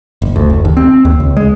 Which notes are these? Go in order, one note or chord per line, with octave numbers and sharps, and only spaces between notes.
F#1
D2
F#1
D#2
C4
D#2
C#2
G#3